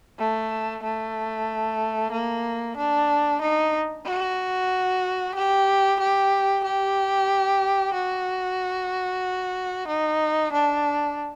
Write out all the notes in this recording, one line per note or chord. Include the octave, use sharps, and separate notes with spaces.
A3
A3
A#3
D4
D#4
F#4
G4
G4
G4
F#4
D#4
D4